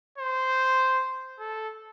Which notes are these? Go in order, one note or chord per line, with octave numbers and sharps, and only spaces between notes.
C5
A4